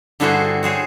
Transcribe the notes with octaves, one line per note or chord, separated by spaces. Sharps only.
G2 D3 E4 F#4 G#4 C5
F#4 G#4 C5 C#5